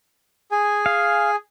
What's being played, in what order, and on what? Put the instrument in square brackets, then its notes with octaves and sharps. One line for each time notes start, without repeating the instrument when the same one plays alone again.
[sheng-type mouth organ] G#4 G#5
[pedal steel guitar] F5